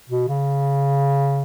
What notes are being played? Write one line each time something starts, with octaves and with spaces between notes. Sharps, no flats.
B2
C#3